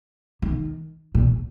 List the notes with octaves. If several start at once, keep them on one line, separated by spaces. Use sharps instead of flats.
D#3
A#2